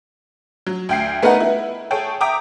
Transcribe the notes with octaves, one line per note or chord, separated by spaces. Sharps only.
F#3
D2 G5 C7
A3 B3 D#4 A#4 B4 F#5
E4
G#4 A4 C#5 G5
E5 G5 A#5 D6 D#6